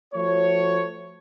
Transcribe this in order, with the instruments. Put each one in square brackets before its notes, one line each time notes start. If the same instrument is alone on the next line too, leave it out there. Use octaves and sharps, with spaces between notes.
[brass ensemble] F3 A3 F#4 C#5